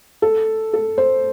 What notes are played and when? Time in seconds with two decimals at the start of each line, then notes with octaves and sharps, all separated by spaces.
0.22 A4
0.73 A4
0.98 C5